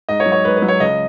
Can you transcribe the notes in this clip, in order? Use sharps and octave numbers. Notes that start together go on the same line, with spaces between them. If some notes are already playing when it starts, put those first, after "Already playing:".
G#2 D#5
C#5
F#3
C#5
G#2 B4
B4
F#3
C#5
C#2 D#5